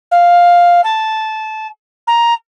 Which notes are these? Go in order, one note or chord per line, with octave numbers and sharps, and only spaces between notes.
F5
A5
A#5